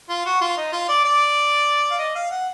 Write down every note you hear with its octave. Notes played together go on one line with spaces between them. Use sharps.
F4
F#4
F4
D#4
F4
D5
D5
F5
D#5
F5
F#5